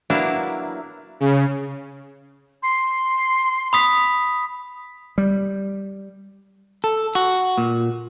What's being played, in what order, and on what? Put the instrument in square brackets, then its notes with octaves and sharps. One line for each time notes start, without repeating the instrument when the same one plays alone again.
[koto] F#3 A#3 B3 D4 E4
[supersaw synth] C#3
[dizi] C6
[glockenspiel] B5 D#6 B6
[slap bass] G3
[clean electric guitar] A4
F#4
A#2